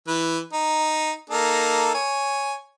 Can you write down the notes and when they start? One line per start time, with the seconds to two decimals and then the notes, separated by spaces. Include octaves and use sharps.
0.07 E3 B4
0.53 D#4
1.30 A#3 D#4 A4
1.94 C#5 G#5